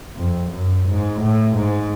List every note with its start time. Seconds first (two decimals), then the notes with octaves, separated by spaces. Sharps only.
0.17 F2
0.52 F#2
0.86 G#2
1.21 A2
1.56 G#2